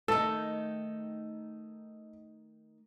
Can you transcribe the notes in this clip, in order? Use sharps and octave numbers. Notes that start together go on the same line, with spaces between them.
D#3 A3 A4